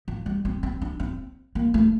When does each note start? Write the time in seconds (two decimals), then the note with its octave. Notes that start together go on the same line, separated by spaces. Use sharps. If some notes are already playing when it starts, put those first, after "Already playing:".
0.08 F3
0.26 G3
0.45 C4
0.63 C4
0.82 D4
1.00 C4
1.55 A#3
1.74 A3